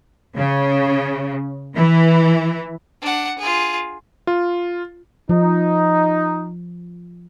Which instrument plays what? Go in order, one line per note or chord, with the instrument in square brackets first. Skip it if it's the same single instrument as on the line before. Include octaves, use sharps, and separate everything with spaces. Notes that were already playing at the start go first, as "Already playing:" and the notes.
[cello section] C#3
E3
[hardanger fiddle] D4 F#5
F4 G#4
[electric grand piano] F4
[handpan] F3 [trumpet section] D#4